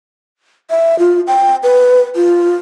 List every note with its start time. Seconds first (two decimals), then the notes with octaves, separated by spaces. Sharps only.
0.70 E5
0.99 F4
1.27 G5
1.63 B4
2.15 F4